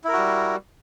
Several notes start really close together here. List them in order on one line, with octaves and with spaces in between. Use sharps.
E4 A#4 F#4 G3